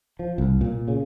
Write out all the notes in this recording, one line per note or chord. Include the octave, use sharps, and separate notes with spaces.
F3
C2
A#2
C#3